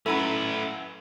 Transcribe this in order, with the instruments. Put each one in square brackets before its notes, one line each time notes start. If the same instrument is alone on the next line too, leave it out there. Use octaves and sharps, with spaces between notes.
[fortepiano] F#2 E4 B5 [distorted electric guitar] A3 B4 [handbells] A4 A#5